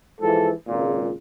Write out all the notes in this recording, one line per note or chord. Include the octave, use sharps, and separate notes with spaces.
G#2 E3 F3 A4
G#1 C#2 A#2